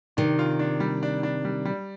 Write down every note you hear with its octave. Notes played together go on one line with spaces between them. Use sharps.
C3 D#3 D4
F4
D4
G3
D4
D4
G3
G3